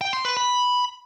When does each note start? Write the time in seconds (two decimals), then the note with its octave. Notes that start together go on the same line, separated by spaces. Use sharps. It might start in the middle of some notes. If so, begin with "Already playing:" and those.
0.01 G5
0.13 C6
0.25 B4
0.37 B5